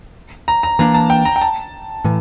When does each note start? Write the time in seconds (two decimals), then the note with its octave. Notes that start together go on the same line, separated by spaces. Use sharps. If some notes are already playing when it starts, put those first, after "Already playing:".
0.48 A#5
0.63 A#5
0.79 E3 A#3 D4 A#5
0.94 A5
1.10 G5
1.25 A#5
1.36 G5
1.41 A5
2.04 A2 E3